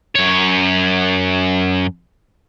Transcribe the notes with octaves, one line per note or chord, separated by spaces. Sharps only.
F#2 C#5